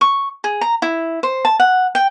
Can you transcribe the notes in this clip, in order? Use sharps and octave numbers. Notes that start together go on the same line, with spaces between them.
C#6
G#4
A#5
E4
C5
A5
F#5
G5